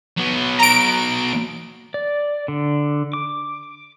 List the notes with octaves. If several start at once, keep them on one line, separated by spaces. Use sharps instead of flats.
F#3 B3
A#5 D7
D5
D3
D6